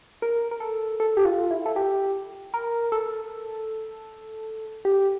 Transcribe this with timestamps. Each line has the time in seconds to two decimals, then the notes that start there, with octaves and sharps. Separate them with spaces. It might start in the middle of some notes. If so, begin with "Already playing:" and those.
0.22 A#4
0.51 A#4
0.60 A4
1.00 A4
1.17 G4
1.25 F4
1.51 E4
1.66 A4
1.76 G4
2.54 A#4
2.92 A4
4.85 G4